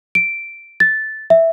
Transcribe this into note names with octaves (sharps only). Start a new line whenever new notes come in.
D7
A6
E5